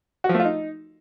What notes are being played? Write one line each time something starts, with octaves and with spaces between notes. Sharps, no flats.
F#4
F3
A3
F4
D#4